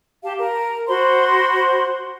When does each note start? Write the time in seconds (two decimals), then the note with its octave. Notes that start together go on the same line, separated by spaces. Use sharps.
0.24 G4 F5 A5
0.39 A#4
0.88 F#4 C5 B5 C6